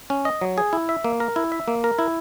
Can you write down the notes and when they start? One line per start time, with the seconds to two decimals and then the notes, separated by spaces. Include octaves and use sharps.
0.10 C#4
0.25 D#5
0.41 F#3
0.58 G#4
0.73 E4
0.89 E5
1.04 A#3
1.20 A#4
1.36 E4
1.52 E5
1.68 A#3
1.84 A#4
1.99 E4